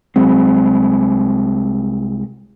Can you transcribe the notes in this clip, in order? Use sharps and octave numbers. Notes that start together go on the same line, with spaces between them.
C2 F#3 G#3 C4